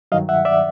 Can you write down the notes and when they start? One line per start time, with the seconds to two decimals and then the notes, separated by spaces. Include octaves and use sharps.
0.12 G2 D#3 F#3 D#5 F5
0.29 E5 F#5
0.45 D5 E5